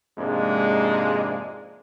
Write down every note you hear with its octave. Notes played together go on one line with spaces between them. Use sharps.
F2 G#2 C3 G#3 A#3 D4